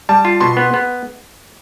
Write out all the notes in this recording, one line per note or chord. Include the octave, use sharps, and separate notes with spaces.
G3 A5
F4
B2 C6
B3
B3